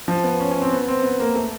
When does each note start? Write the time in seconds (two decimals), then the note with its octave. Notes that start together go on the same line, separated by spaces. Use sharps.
0.08 F3
0.24 B3
0.40 C#4
0.51 C#4
0.62 C4
0.72 B3
0.88 C4
1.03 B3
1.20 A#3
1.35 A3